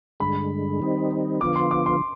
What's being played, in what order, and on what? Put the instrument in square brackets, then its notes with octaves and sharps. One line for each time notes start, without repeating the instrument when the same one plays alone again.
[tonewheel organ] G2 D3 G#3 [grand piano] B5
[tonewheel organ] D#3 G3 C4 D#4
[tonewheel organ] D3 F3 B3 F4 [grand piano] D6
[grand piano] C6
D6
C6